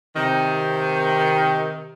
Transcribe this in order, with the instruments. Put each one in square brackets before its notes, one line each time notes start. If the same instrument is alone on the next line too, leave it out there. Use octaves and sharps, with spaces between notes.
[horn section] C3 D#3